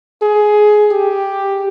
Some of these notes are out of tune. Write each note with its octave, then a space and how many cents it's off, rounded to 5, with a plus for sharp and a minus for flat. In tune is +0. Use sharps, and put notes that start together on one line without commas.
G#4 +15
G4 +5